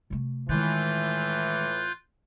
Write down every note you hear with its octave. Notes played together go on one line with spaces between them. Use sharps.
C3 A3
A2 D#3 E3 G#3 F4 F#6 G6